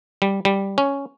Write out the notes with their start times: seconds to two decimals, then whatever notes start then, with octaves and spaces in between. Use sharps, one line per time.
0.22 G3
0.45 G3
0.78 C#4